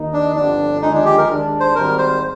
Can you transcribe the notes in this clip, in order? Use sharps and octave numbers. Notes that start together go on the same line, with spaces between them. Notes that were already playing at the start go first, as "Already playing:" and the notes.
Already playing: D#2 D#3 A#3 D#4
D4
G1 F2 D3 D4
D#2 D3 F3 G#3 D#4
D4
G4
A#4
D#2 D#3 G#3 D4
C5
G#1 G#2 G3 A#4
C5